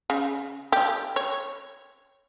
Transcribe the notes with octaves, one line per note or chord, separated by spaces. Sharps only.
C#3
G4
C#5